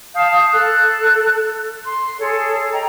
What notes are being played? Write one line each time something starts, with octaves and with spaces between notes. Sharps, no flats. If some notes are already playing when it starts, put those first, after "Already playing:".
F5 A5 D#6 G6
A4 F#6
C6
G#4 A4 C#5
D#5 G5 A#5